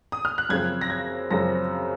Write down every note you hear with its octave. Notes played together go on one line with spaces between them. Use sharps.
D#6
F6
F#6
F#2 C#3 F3 C4 G#6
A#6
G#6
F#2 C#3 F3 C4 A#6